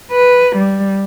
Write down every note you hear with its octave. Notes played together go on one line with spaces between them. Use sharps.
B4
G3